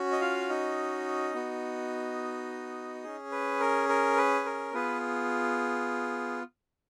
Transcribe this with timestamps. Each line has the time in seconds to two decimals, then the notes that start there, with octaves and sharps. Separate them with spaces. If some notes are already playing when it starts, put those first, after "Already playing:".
Already playing: C#4 F#4
0.12 D#5
0.21 F4 F5
0.49 D#4 D#5
1.34 B3 F#4
3.04 C#4 G#4
3.32 B4
3.60 A#4
3.89 A#4
4.17 B4
4.45 A#4
4.73 B3 F4 G#4 B4